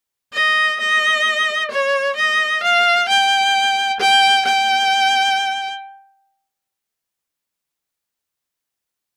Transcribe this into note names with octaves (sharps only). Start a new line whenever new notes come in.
D#5
D#5
C#5
D#5
F5
G5
G5
G5